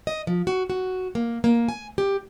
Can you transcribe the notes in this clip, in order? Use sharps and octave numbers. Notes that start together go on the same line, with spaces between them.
D#5
F3
F#4
F#4
A#3
A#3
G#5
G4